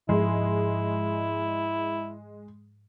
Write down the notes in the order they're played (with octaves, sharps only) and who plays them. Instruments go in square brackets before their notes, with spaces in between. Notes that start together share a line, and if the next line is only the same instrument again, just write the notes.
[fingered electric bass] G#2 F3 [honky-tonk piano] G#3 [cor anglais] E4